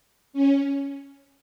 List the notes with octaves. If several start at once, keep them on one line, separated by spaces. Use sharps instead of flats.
C#4